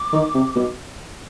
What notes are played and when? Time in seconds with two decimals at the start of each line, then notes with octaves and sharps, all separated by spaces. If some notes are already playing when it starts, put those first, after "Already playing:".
Already playing: D6
0.13 D#3
0.35 C3
0.56 B2